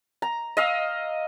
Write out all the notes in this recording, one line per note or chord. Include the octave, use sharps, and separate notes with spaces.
A#5
D#5 F5 E6